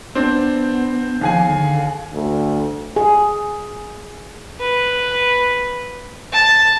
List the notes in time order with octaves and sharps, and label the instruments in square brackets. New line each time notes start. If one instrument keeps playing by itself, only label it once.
[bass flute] B3 [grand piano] C4 D4
[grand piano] D#2 G#4 G#5 [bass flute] F3
[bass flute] D3
[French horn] D2
[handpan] G#4
[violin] B4
A5